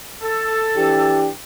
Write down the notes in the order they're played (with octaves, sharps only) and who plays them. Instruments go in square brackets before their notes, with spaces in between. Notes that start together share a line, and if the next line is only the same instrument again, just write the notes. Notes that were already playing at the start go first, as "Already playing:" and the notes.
[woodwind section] A4
[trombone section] E3 D4 G4